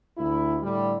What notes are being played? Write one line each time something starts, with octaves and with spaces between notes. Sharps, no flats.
D2 E4
A2 D3 G3